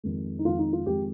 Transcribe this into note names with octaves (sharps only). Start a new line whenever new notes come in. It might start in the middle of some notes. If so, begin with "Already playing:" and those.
F2 D#3 G#3
D#4
F2 D#3 G#3 F4
D#4
F4
F2 D#3 G#3 G4